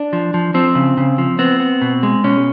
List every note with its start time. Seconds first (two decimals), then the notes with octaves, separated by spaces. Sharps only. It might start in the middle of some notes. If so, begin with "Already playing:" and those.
Already playing: D4
0.13 F3
0.34 F3
0.54 F3 C4
0.75 C#3
0.97 C#3
1.18 F3
1.39 B3 C4
1.60 B3
1.82 B2
2.03 G#3
2.24 B2 C#4